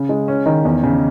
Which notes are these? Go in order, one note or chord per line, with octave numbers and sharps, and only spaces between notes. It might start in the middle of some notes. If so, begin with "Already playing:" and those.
Already playing: C#3
G#3
C#4
D#3
E2
C#3